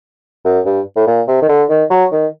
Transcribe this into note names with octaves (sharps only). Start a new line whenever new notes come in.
F#2
G2
A2
A#2
C3
D#3
D3
D#3
F#3
D#3